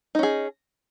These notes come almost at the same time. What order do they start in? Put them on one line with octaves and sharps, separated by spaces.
D#4 C#4 G#4